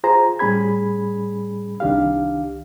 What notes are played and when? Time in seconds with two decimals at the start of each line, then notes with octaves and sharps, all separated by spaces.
0.04 F4 G#4 C5 A#5
0.39 A2 G3 C#4 G#4 B5 G#6
1.80 C2 D#3 D4 G4 F5